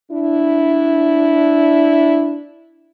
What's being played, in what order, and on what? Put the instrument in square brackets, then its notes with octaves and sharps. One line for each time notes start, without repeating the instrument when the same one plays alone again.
[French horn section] D4 E4